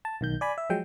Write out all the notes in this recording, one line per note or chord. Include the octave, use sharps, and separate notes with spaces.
A5
B1 D#3 G6
D5 G#5 B5
E5
F3 F#3 G#3 G5